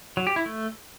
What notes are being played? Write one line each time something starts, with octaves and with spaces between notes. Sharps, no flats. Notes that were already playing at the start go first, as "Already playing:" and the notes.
F#3
G4
E4
A3